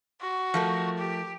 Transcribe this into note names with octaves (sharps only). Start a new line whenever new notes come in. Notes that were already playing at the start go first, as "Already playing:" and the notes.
F#4
F3 A3 A#4
G4